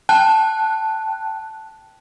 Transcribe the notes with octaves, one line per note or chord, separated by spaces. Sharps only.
G5 A5 F#6